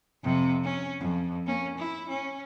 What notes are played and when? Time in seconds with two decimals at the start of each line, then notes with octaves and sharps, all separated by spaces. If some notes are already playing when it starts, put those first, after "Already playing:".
0.23 F2 C3
0.63 C#4
1.00 F2
1.47 A#3 C#4
1.78 E4
2.09 C#4